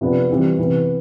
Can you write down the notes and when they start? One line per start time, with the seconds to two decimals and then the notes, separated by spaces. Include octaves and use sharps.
0.01 C3 F3 B3 D4 F4
0.30 E3 G3 C4 F4
0.59 C3 E3 B3